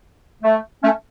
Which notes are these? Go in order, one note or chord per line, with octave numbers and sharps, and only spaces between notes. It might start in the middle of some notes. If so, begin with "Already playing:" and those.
A3
A3 C#4